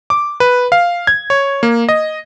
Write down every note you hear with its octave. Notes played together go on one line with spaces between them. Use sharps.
D6
B4
F5
G#6
C#5
A#3
D#5